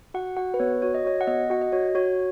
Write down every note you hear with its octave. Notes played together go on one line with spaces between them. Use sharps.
F#4 F#5
F#4 F#5
B4
B3 C#5
F#4 C#5
D#5
F#4 C#5
F#5
B3 D#5
F#4 F#5
D#5
F#4 C#5
F#4 C#5